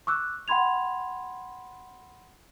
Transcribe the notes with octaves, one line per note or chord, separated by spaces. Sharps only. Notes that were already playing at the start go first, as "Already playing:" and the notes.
C#6 D6 E6 F#6
F#5 G5 B5 C6 G#6 F7